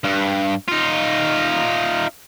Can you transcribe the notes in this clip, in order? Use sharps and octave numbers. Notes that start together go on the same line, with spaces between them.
G2
D#4 F4